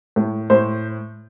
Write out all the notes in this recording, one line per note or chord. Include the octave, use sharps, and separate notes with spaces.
A2
A2 C5